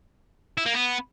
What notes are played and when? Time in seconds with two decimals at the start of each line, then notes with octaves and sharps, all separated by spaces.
0.57 E4
0.66 A#3
0.74 B3